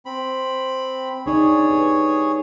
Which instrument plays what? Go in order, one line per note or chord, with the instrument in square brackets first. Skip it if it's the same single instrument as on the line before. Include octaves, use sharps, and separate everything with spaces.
[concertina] C4 B5
[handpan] D4 D#4 D5 [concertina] G#4 C#5
[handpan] G4 B4